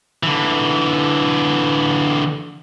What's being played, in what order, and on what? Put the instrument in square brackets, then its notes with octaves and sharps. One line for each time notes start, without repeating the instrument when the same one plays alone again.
[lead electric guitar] D3 E3